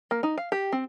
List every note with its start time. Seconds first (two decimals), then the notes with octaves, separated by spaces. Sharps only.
0.11 A#3
0.23 D#4
0.38 F5
0.52 G4
0.72 C4